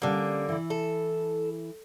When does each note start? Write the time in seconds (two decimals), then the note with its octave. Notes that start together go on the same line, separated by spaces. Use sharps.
0.02 D3 G3 A#3 C#4 A5
0.49 E3 E4
0.70 A4